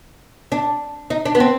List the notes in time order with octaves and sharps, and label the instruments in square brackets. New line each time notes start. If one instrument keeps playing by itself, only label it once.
[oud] D4
D#4
D4
B3
C4